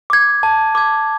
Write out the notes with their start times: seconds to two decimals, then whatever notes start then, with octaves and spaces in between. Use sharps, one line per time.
0.10 D6 G#6
0.43 A5
0.75 D6 G#6